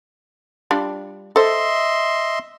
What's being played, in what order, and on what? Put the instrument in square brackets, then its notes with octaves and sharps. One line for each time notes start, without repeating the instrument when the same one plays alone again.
[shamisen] G3 D4 F4
[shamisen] A4 C5 [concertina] D#5 E5 C6